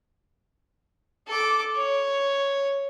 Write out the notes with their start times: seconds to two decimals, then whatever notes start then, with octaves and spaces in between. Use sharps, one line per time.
1.28 A4 D6
1.76 C#5